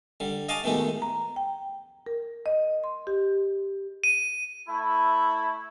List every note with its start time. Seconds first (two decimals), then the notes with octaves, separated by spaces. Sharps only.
0.20 D3 G3
0.49 D#5 F5 G#5 A5 C#6 D6
0.64 B2 D#3 G#3 A3 G4
1.02 A#5
1.36 G5
2.06 A#4
2.46 D#5
2.84 C6
3.07 G4
4.04 D#7
4.68 A3 E4